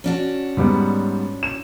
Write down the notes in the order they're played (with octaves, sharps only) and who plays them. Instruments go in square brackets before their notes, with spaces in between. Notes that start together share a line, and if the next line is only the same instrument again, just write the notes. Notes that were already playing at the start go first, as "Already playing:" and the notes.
[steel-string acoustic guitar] C#4 D4 F#4
[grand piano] G#2 G3 B3
E7